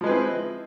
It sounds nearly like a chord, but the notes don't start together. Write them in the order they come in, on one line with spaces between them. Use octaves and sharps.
F3 G#3 B4 C4 E4